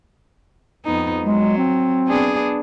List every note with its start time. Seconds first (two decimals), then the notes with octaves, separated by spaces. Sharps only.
0.85 F2 B3 D#4
1.24 F#3 G#3
1.58 C4
2.07 B3 D4 G#4